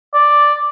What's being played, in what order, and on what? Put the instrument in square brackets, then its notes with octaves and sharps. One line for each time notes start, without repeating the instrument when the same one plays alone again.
[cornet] D5